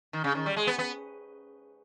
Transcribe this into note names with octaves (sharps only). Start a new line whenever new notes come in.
D#3
C#3
D#3
G3
G#3
B3
B3